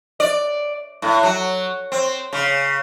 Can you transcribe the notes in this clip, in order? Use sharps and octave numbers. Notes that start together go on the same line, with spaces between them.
D5
A2
F#3
C4
C#3